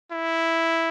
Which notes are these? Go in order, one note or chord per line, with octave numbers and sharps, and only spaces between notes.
E4